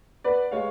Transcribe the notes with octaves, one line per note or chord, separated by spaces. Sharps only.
B3 B4 D5
G#3 C#5 F5